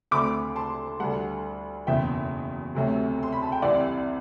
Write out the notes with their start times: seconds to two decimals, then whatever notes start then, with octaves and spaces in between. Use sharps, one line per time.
0.11 D2 D3 A3 C4 B5 D6
0.55 A5 C6
1.00 D2 D3 G3 F#5 A5
1.87 F#1 E2 B2 E5 G5
2.75 D2 C3 F#3 A3
3.23 C6
3.32 B5
3.42 A5
3.52 G5
3.62 C2 C3 E3 D5 F#5